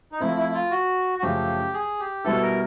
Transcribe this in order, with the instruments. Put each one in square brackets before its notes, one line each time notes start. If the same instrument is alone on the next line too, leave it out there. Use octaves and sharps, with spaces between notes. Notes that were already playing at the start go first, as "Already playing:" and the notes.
[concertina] D#4
[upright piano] F3 A3 C4 [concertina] E4
[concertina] E4
E4
F4
F#4
F#4
[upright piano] F#2 C#3 F3 A3 [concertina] G4
[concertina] G#4
G4
[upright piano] B2 G3 B3 E4 [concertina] A4
[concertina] A#4